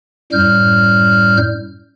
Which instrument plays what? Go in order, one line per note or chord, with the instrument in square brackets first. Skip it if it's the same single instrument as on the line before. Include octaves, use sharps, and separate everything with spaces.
[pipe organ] F#2 A2 G3 F6 G6